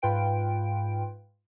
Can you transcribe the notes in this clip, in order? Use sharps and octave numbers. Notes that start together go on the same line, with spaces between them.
G#2 F4 B4 G5 D7